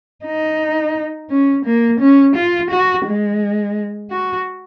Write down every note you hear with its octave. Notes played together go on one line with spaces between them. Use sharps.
D#4
C#4
A#3
C#4
F4
F#4
G#3
F#4